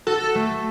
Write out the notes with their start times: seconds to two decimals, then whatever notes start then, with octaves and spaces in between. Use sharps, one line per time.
0.07 F#4 A4
0.35 A3